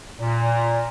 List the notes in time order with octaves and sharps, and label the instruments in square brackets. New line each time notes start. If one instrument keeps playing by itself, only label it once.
[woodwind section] A#2